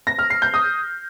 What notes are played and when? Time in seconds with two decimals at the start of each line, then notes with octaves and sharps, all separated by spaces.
0.07 A#6
0.19 F6
0.30 C7
0.42 G6
0.54 D#6